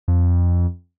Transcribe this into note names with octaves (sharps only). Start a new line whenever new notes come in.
F2